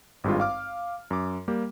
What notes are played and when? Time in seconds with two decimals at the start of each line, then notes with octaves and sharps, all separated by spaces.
0.24 G#1 G2 G#3 F4
0.40 F5 D6 F6
1.11 F#2 D6
1.48 G3 A#3 G4